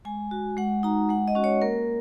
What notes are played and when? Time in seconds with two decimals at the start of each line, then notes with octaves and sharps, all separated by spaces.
0.05 G#3 G#5
0.31 F#4
0.57 G#3 F#5
0.83 D#4 F#4 A#5
1.09 G#3 F#5
1.28 D#5
1.35 C#4 F#4
1.44 C#5
1.62 A#3 A#4